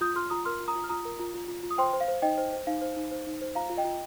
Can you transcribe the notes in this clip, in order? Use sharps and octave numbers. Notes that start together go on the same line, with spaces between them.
F4 D#6 G6
F4 C6 F6
F4 A#5 D#6
A#4 C6 F6
F4
A#5 D#6
F4
F6
F4 A#5 D#6
A#4
F4
F4
F4
F4
D#6
C5 G5 C6
C5
F5
C5
D#4 D#5 G5
C5
C5
D#4 F5
C5
D#4
C5
D#4
C5
F4 F5 A#5
F4
D#5 G5
F4